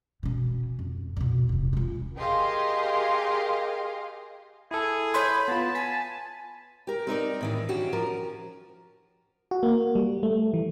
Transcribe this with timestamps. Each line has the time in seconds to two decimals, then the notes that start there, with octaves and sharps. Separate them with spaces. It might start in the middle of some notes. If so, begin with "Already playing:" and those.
0.23 B2 C#4
0.79 F2
1.17 F2 B2
1.49 D#1 C3
1.73 C#4 F4
2.18 G4 G#4 A#4 D#5 F5 C6
4.71 E4 G#4 A4
5.14 C#5 B5 C6
5.48 B3 F4 A5
5.75 G#5 B6
6.87 G4 A#4
7.07 C4 D#4 A#4 D5
7.41 A2 D#3 E3
7.69 C#4 D4 F#4 G4
7.93 F3 A#4
9.51 F#4
9.63 A#3
9.95 G3
10.23 A3
10.54 E3